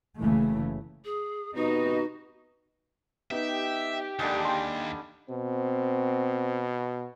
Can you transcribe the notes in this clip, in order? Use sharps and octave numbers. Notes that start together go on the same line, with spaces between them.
F#1 C#3 E3 A3
G#4
C3 B3 D#4 F#4
B3 D#4 G4 E5
D#2 D3 G3 G#3
G5 G#5 C6
B2 C4